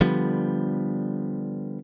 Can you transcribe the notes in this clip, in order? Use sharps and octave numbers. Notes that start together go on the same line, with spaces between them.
D3 F3 G3 B3